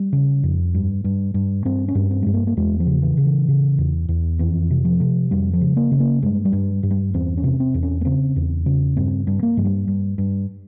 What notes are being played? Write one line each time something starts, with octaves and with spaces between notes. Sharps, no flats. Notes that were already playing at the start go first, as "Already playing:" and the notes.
Already playing: G3
C#3
F2
G2
G2
G2
G2 C4
C#4
G2
C4
G2 G#3
A#3
A#3
E2 G#3
F3
C#3
E3
C#3
E3
C#3
E2
E2
F2 E3
C3
F3
C3
F2 G3
F3
C#3
A#3
C#3
A#3
G2 G#3
G3
G2
G2
G3
E2 C4
C#4
C3
C4
E2
C#4
A#3
C#3 C4
E2
C#3
G2 C4
G2
A#3
G2 F3
G3
G2
G2